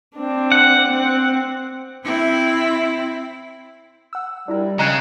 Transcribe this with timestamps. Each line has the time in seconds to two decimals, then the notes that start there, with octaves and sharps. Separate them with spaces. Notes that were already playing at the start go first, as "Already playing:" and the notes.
0.17 C4 D4
0.52 F#5
0.88 C4
2.04 C4 E4
4.13 F#5 E6
4.48 G3 D4 E4 A#4
4.79 C#3 D#5 G#5 A#5 F#6 G#6